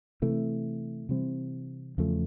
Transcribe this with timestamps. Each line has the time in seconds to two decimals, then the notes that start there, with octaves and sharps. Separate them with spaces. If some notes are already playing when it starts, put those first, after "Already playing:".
0.22 C3 E3 A3
1.09 C3 E3 G3 C4
1.98 E2 C#3 F3 A3